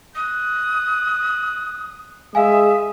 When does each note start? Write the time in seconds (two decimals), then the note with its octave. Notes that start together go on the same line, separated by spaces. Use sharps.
0.15 D#6 F#6
2.35 G#3 E5 F5 G#5 D#6